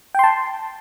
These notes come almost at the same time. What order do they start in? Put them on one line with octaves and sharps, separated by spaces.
G5 C6 A5